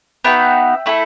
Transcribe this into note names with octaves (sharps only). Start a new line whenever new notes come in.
B3 D#4 F#4 E5 G5
A3 E4 A4